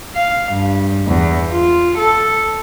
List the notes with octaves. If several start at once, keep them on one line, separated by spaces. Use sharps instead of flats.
F5
G2
E2
F4
A4